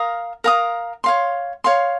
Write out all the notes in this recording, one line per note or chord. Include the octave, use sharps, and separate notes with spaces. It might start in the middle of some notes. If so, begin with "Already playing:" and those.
Already playing: A#4 F5 A#5 D#6
A#4 F5 A#5 D#6
C#5 F5 C6
C#5 F5 C6